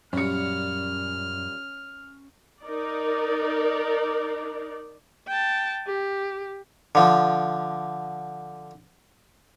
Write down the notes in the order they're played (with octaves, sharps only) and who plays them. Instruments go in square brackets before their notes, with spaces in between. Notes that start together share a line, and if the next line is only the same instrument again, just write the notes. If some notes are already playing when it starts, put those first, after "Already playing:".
[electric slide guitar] F#2 [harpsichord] A#2 G3 [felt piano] C#4 C#7 [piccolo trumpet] F6
[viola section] D#4 A#4 D5
[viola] G5 A5
G4
[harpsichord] D3 F3